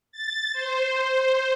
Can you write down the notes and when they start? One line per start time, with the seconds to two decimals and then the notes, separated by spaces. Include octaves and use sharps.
0.12 A6
0.53 C5